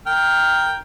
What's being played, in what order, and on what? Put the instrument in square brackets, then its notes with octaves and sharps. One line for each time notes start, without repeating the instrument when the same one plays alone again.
[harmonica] A#4 G5 F6